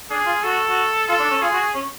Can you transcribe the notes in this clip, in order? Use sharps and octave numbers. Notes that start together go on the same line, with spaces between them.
D4 G#4
F4
F#4 A4
F#4
F4 A4
D4
C#4
F4 G#4
F#4
C#4